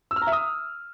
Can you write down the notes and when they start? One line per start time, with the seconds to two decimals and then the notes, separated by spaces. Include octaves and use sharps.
0.11 E6
0.16 F6
0.22 A#5
0.27 E5
0.32 D#6